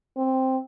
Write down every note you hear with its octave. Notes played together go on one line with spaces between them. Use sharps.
C4